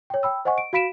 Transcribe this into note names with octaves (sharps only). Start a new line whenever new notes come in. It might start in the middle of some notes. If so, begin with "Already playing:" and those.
C#5 G5
G5 B5 E6
C5 D#5 F#5 G#5 C#6
D7
F#4 F5 B5 B6 D7 E7